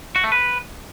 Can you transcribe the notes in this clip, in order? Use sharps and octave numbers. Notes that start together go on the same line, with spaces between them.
F#4
A3
B4